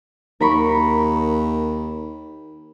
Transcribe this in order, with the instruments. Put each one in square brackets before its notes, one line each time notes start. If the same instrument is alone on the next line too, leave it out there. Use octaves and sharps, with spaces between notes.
[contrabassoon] D#2 [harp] A#4 B5 C#6